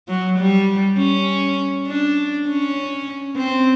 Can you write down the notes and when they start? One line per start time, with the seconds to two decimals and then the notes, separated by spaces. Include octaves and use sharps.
0.08 F#3
0.39 G3
0.98 C#4
1.88 D4
2.48 C#4
3.37 C4